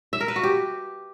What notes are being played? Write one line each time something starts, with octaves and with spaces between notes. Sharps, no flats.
E5
A#4
B4
F#4
G4